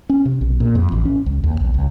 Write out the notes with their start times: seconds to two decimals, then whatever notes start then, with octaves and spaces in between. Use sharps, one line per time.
0.10 C#4
0.25 C3
0.41 B1
0.60 A#2
0.75 F2
0.92 A1
1.05 C#4
1.26 C#2
1.44 D#2
1.61 B1
1.74 C#2